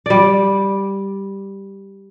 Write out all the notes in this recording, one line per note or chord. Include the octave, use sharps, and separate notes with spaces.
G3 D5